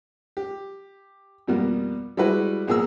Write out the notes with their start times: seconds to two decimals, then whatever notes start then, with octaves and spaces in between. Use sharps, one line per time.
0.37 G4
1.48 F2 B2 G3 A#3 B3
2.17 G3 G#3 E4 F#4 B4
2.67 A#1 B3 G#4 A#4 E6